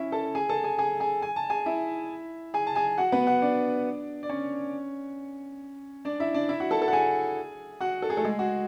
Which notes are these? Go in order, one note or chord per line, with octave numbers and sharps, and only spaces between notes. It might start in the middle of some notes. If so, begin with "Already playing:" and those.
Already playing: C#4 E4 C#5 E5
A4 A5
G#4 G#5
A4 A5
G#4 G#5
G#4 G#5
G#4 G#5
G#5
A5
G#4 G#5
E4 E5
G#4 G#5
A5
G#4 G#5
F#4 F#5
B3 B4
F#4 F#5
D4 D5
D5
C#4 C#5
D4 D5
E4 E5
D4 D5
E4 E5
F#4 F#5
A4 A5
A4 A5
F#5
G#4 G#5
F#4 F#5
A4
G#4
A3 A4
G#3 G#4
F#4